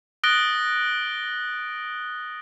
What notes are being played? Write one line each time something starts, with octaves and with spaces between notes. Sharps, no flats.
D#6 F#6 A6 A#6 D7 G7